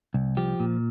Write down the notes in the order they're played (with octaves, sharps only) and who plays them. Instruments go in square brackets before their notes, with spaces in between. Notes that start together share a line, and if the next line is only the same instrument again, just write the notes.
[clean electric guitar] C2
F3 G4
A#2